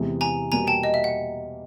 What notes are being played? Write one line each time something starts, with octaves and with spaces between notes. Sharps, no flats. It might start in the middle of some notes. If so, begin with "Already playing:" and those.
Already playing: E2 C3 E3 G#3
G#5 A#5
E2 B2 G3 A#3 G#5 A#5
G5 A5
D#5
E5
F#5